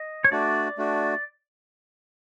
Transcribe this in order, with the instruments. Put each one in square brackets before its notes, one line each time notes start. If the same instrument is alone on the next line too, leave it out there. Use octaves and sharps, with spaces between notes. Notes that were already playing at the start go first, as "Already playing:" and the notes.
Already playing: [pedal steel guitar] D#5
C#5
[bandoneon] A3 D4 F#4 [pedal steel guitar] D5
[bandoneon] A3 D4 F#4